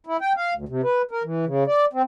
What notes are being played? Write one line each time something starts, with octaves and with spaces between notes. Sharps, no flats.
E4
G5
F5
D2
C3
B4
A#4
E3
C#3
D5
C4